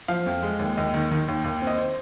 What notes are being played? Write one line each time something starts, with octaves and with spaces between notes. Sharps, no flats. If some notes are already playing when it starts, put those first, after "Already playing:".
F3 F5
F2
G#3
D#2
D#2 D#5
D#3
D#3
D#2
D#2
C4
D#5
C5